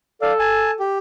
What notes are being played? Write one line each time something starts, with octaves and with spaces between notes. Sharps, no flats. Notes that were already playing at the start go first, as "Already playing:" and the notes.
A4 D5 F5
G#5 A5
G4